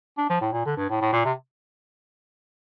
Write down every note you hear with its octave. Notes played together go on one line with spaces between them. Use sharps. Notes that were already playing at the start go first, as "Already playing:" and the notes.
D4
F3
A2
A#2
D3
G2
A2
A2
A#2
C3